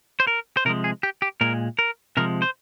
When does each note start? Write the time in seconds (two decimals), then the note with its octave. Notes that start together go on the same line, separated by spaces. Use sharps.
0.20 C5
0.27 A#4
0.57 C5
0.65 C3 F3 G#3 A#4
0.84 G#4
1.03 G4
1.22 G4
1.41 A#2 G#3 A#4
1.79 A#4
2.17 C3 F3 G#3 A#4
2.42 C5